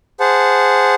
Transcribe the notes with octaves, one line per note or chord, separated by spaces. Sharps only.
G#4 C5 F#5 A5